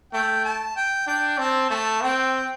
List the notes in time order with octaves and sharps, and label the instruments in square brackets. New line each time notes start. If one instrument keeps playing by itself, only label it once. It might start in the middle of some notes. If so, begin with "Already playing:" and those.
[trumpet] A3 [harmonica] G5
[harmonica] A5
G5
[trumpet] D4 [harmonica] G5
[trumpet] C4 [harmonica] A5
[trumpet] A3 [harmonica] A5
[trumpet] C4 [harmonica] G5